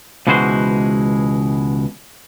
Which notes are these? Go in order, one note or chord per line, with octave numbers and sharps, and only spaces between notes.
C#2 B2 E3 G#3 F#4 C5